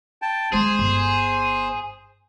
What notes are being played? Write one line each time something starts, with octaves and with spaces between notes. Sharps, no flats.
G5 A5
G#3 B3 G#4 C5
G1